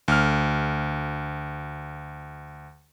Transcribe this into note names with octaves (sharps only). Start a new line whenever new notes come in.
D2 F6